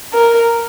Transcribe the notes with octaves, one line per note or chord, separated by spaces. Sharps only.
A#4